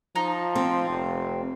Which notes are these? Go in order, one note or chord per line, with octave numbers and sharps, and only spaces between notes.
F3 D#4
C4
F1